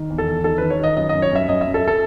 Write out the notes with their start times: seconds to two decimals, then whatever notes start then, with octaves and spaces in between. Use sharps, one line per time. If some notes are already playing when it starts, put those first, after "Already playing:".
Already playing: D#3
0.10 E2
0.18 A4
0.27 E2
0.44 D#3 A4
0.58 D#3 B4
0.70 C#5
0.80 D#3 D#5
0.96 F#2 D#5
1.09 F#2 D#5
1.22 C#5
1.31 F#2 E5
1.48 F#2 D#5
1.61 F#2 E5
1.74 A4
1.87 A4